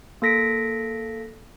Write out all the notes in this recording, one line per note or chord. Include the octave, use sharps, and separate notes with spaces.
A#3 A4 A#6 B6 D7